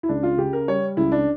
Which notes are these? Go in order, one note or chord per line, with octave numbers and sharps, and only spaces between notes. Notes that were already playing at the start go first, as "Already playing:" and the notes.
E4
C#2 D4
F4
C#3 G4
A#4
G3 C#5
C#2 E4
D4